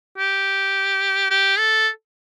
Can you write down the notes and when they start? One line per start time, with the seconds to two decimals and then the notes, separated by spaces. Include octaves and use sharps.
0.18 G4
1.30 G4
1.59 A4